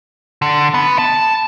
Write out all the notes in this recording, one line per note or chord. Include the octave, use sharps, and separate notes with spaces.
D3
B3
A5